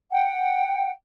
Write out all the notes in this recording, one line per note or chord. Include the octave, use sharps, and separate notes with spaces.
F#5 G5